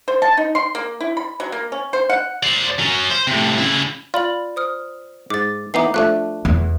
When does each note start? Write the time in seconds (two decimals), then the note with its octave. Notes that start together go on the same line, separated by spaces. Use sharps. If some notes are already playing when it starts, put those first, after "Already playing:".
0.08 C5
0.22 A5
0.37 D#4
0.55 C6
0.75 A#3
1.00 E4
1.17 B5
1.40 F#3
1.52 A#3
1.72 C#4
1.93 C5
2.10 F#5
2.43 C5 D5
2.79 F#3 C#4
3.10 C5
3.27 A2 C3
3.57 C#3 E4
4.14 F4 D5 B5 F#7
4.56 C5 D#6 F6
5.30 G#2 D6 A6
5.74 E3 B3 D#4 D6 C7
5.94 F3 A3 D4 F#6
6.45 E2